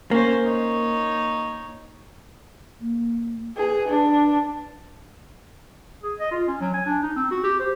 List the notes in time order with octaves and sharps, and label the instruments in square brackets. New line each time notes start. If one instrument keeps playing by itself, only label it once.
[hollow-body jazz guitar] A#3 [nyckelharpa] C#4 C5
[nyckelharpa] D#4 C#5
[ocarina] A#3
[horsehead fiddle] G#4 [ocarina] B4
[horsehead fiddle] D4
[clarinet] G#4
D#5
F4
C#4
F#3
G#5
D4
D#4
C4
F#4
G4
C5